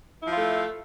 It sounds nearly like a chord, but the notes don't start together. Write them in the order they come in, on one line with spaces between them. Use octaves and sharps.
E4 F3 F4 A3